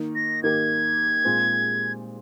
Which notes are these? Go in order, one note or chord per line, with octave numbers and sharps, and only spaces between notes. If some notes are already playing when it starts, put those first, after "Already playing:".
Already playing: D#3 A#3 D#4
A#6
D#3 A#3 D#4 G4 A#4 G#6
A#2 G#3 C4 F4 G#4